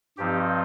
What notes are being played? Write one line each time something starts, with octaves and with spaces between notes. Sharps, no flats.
G2 F3 C4 D#4 G4